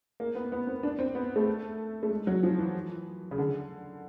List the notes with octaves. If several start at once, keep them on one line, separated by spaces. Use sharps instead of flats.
A#3
B3
B3
C4
D4
C4
B3
A3
A3
G#3
F#3
F3
E3
C#3
D3